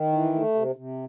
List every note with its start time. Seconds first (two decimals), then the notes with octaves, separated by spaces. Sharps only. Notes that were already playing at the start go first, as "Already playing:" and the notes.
Already playing: D#3
0.12 E3
0.34 A3
0.55 C3
0.76 C3